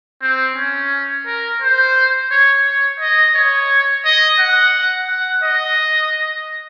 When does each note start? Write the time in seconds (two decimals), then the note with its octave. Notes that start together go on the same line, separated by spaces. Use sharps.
0.22 C4
0.56 C#4
1.26 A#4
1.62 C5
2.31 C#5
2.66 C#5
3.00 D#5
3.35 C#5
4.05 D#5
4.40 F#5
5.10 F#5
5.44 D#5